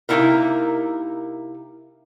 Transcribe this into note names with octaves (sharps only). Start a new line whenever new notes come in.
C3 A#3 C4 D#4 E4 A#4